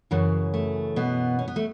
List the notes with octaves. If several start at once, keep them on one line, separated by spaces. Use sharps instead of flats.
F#2 C#3 E3
A3
B2 B3
C#4
B3
A3